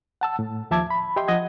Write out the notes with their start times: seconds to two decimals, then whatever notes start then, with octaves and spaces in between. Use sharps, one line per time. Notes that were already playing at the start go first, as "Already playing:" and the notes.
0.21 F#5 A5 E6
0.39 A2
0.71 D#2 F3 E5 A5 D6 G#6
0.90 B5
1.16 G4 D#5 E5 G5 C6
1.28 F3 D#5 F#5 G#6